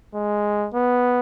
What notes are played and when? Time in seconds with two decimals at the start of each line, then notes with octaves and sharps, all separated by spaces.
0.14 G#3
0.74 B3